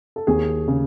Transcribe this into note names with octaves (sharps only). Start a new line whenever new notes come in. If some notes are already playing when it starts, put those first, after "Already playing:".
A4
D#2 G#4
C#3